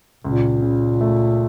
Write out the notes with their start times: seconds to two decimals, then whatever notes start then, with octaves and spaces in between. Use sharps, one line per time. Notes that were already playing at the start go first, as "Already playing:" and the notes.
0.25 C#2 A#2
0.62 C#3
1.01 A3